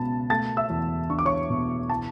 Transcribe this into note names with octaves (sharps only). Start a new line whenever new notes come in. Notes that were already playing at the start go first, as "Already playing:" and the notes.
Already playing: C#2 B2 B3 A5 B5
A3 A5 A6
E5 E6
E2
D4 C#6
D6
C#5 C#6
B2
E3 A5